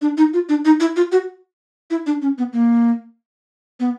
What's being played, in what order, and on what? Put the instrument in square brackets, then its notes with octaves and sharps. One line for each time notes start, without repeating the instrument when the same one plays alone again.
[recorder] D4
D#4
F4
D4
D#4
E4
F4
F#4
E4
D4
C#4
B3
A#3
B3